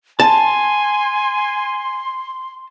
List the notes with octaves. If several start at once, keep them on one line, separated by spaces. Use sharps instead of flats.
G#5 A5 C6